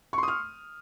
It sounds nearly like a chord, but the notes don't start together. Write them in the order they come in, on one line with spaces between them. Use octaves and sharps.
C#6 C6 D#6 F6